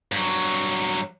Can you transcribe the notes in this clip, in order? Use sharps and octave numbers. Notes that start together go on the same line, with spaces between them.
G2 F#3